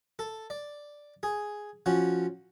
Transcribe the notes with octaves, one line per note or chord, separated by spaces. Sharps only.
A4
D5
G#4
F3 C#4 F#4